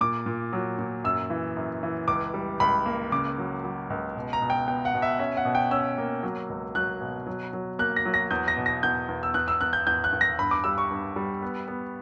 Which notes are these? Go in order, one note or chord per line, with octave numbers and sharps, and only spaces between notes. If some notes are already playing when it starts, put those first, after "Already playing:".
A#2 D6
A#2
F#3
A#2
F#2 E6
E3
F#2
E3
C#2 D6
G3
C#2 B5
A#3
C#3 D6
F#3
F#3
C#2
B2
A#5
B2
G5
B3 G5
F#5
B2
E5
C#4 E5
F#5
B2
G5
C#4 E6
A#3
F#3
C#2
F#3 F#6
B2
F#3
F#3
A#3 F#6
A#6
F#3
A#6
E2 G6
A#6
B2
A#6
E2 G6
E2
E6
E2 F#6
E6
E2 F#6
G6
E2 G6
F#6
E2
A#6
G2 B5
D6
G3 E6
C#6
G2
G3
B3
B3